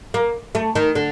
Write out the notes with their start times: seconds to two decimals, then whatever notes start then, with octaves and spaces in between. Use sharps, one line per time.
0.14 A#3
0.55 A3
0.75 D#3
0.95 D3